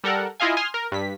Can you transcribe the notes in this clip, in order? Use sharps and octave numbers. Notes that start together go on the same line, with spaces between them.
G3 A4 A#4 F#5
E4 F4 D#5 F5 G#5
G#5 C6 D#6 F6
A#4
G2 B6